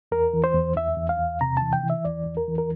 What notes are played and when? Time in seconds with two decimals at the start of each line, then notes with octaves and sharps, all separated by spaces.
0.12 E2 A#4
0.33 E3
0.44 C5
0.54 E2
0.76 E2 E5
0.97 E2
1.09 F5
1.19 E2
1.41 C3 A#5
1.57 E3 A5
1.73 G5
1.83 E3
1.90 E5
2.05 E2 D5
2.26 E2
2.37 A#4
2.48 E3
2.58 A#4